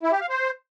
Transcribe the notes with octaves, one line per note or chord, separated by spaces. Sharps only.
E4
G4
F5
C5